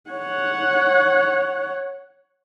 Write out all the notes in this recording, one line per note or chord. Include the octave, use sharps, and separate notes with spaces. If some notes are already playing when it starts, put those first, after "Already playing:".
C#5 F#5